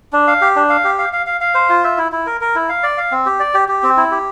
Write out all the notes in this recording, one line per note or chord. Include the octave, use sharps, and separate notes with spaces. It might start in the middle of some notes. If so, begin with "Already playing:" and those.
D4
F5
G4
D4
F5
G4
F5
F5
F5
F5
C5
F4
E5
E4
E4
A#4
A#4
E4
F5
D5
F5
C4
G4
D5
G4
G4
C4
E4
G4